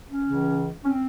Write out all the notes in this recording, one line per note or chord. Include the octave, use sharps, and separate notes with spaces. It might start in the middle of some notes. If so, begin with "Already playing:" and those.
C#4
C#2 C#3 E3
C#4
C4